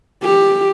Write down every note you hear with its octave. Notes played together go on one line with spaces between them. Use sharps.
G4